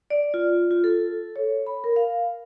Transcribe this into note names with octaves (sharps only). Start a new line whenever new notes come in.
D5
F4
F4
A4
C#5
B5
A#4
F5